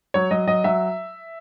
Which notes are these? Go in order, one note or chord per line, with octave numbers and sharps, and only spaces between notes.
F#3 C#5
F#3 D#5
F#3 D#5
F#3 E5